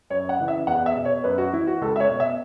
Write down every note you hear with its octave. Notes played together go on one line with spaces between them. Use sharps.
F#2 C#5
F#5
C#3 E3
E5
E2 F#5
E5
B2
C#5
F#2 B4
F#4
E3 E4
F#4
C#2 A4
E5
C#5
B2
E5